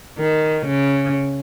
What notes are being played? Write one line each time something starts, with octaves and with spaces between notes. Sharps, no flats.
D#3
C#3